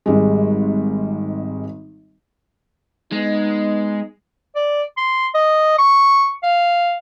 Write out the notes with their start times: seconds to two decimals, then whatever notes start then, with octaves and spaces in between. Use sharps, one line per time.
0.06 G#1 G3 G#3
3.12 G#3 B3 D#4
4.56 D5
4.97 C6
5.35 D#5
5.79 C#6
6.43 F5